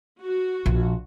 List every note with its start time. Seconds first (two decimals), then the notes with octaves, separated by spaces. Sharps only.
0.22 F#4
0.66 A#1